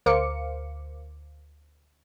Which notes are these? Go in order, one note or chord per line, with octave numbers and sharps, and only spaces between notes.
D2 A#4 C5 F5 D6 C#7